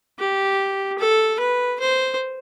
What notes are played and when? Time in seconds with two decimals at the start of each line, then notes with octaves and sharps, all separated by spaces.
0.19 G4
0.99 A4
1.40 B4
1.79 C5